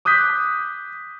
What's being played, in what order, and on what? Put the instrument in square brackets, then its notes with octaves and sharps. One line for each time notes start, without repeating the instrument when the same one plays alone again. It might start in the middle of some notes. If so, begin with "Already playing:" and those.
[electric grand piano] D6 D#6 F#6 G6 B6